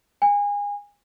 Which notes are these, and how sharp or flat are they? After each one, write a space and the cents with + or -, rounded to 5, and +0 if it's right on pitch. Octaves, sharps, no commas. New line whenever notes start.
G#5 -30